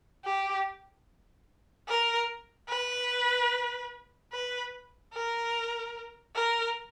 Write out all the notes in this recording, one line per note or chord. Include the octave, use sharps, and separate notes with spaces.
G4
A#4
B4
B4
A#4
A#4